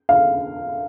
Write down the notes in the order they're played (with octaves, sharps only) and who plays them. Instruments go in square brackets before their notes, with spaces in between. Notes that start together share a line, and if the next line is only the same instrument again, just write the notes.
[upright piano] F5